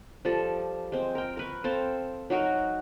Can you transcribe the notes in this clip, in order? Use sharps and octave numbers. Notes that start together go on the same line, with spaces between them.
F3 G3 A4
G#3 C4
A#4 G5
A#4 B4 C#6
C4 A4 F5
F#3 D#4 F#4 A#4